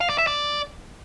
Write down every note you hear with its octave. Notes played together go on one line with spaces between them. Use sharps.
F5
D5
E5
D5